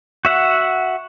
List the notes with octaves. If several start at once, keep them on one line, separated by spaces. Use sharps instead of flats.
F#4 E5 F#5